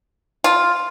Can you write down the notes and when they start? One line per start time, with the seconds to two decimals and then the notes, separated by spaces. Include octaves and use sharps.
0.44 F4